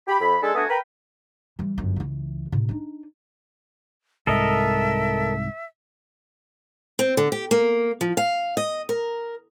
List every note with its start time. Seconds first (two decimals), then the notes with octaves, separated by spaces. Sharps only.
0.08 G4 B5
0.20 F2 B5
0.42 G#3 D4 G#4 A4
0.55 A3 B3 D4 F#4 G#5 D#6
0.69 A#4 B4 G5 B5
1.59 E3 G3
1.78 G1 F#2
1.96 C#2 E3
2.52 A2 C3
2.69 D4 D#4
4.27 C2 G#2 A4 A#4 D#5 E5
6.99 C4
7.17 D3
7.32 G4
7.51 A#3
8.01 F3
8.17 F5
8.57 D#5
8.89 A#4